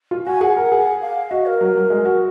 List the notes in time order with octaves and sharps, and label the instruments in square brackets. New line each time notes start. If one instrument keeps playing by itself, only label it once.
[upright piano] F4
[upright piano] F#4 [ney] G#5
[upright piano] G#4 [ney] F#5
[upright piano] A#4
G#4
[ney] F5
[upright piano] F#4 [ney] D#5
[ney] A#4
[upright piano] F#3
F#3
G#3
F#4